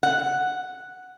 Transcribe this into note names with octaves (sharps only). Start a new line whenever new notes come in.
F#5